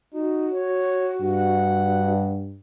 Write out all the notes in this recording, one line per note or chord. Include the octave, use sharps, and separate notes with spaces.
D#4 F#4
C#5
G2 F#5